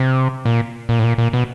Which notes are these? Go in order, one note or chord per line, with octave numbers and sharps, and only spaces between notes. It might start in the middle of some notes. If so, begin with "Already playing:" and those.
Already playing: C3
A#2
A#2
A2
A#2
A#2
B2